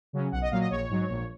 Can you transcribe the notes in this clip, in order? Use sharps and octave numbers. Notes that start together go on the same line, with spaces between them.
C#3 F#3 C#4
B1 F#5
D#5
A#2 F#3 F5
D#5
A#1 C#5
G#2 F#3
A#1